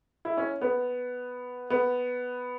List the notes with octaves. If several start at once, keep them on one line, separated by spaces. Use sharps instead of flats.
E4
C#4
B3
B3